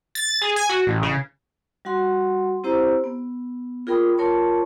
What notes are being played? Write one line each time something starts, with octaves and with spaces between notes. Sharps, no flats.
A6
G#4
G#5
F#4
A1
C#3
G3 F#4 F#5 C6
C4 E4 G4 C5 A#5 E6
B3
F4 G#4 A#4 G5 B5 D#6
F4 A#4 C#5 A5 C6 C#6